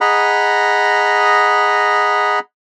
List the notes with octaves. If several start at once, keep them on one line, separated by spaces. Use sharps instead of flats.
G#4 D#5 F#5 A#5 B5